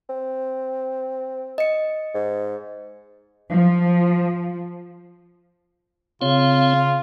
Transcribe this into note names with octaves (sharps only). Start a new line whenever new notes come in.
C4
D#5 C#7
G#2
F3
C#3 C4 F4 C#5